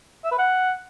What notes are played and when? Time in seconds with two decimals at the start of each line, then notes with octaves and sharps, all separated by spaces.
0.24 E5
0.31 B4
0.39 F#5